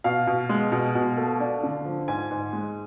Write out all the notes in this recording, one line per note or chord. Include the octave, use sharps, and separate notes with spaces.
B2 F5
B2
G#3
B2
B2
A3
D4
D3
F3
G#2 G#5
G#2
G#3